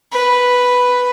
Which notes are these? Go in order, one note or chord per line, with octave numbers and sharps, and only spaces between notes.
B4